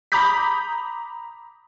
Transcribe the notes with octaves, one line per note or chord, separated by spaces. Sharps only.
A#5 B5 D6 D#6 G6 B6